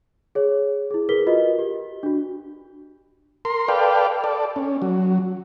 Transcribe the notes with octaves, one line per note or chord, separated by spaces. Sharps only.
G#4 C#5
E4 G#4
G#4 A#4 B4 B6 G7
F4 F#4 A#4 B4 D#5
G4
D4 F#4
A#4 C6
A4 B4 D5 F5 G5
A4 D5
C#4
F#3